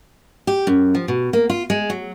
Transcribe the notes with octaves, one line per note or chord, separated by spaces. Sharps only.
G4
F#2
F3
B2
A#3
F4
G#3
F#3